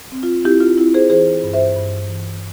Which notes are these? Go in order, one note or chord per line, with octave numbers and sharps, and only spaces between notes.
C4
F4
C4 E4 G4
F4
C4 E4
G#4 C5
E3 G#4 C5
G2
C5 E5
G2
E3